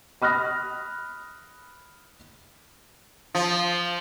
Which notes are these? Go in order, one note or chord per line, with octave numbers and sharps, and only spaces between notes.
B5 D#6 F6 F#6 A#6
F3